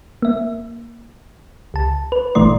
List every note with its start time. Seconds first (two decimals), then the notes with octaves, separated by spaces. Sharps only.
0.22 A#3 E5
1.74 C#2 A5
2.12 B4
2.35 G#1 A#2 E3 A3 D5 C6